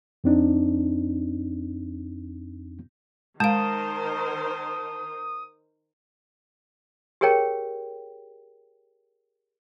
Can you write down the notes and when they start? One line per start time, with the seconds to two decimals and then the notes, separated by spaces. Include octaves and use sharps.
0.24 F2 C4 D4 D#4
3.40 D#3 G#3 A#4 C5 F5 A5 D#6
7.21 G4 G#4 A#4 C#5 G5